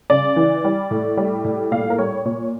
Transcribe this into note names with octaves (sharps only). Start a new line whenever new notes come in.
C#3 D5
E3
G3
A2
G3
A2
A#2 F5
A#4
G3 C#5
A#2 C#5